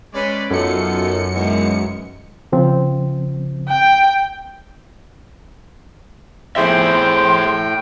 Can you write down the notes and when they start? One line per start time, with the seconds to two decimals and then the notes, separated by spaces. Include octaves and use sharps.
0.14 G#3 C#4 B4 D5
0.50 F#2 B3 D#4 F4 A4 C#7
1.34 B2 D#3 E3 G#3
2.52 C#3 F3 C4
3.68 G5
6.56 A2 C4 G#4 E5 G5 C6